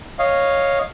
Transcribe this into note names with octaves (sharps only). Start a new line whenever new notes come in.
C#5 D#5 F5